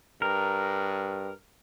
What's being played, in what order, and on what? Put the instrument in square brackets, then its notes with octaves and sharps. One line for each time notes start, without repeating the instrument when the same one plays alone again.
[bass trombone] G2 [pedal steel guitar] A#4